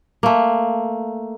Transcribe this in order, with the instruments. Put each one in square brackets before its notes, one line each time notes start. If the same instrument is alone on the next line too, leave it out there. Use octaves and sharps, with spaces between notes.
[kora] A3 A#3